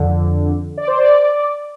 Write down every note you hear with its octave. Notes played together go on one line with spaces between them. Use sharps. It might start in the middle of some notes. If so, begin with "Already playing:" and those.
Already playing: F2 D3
D5
C5
D5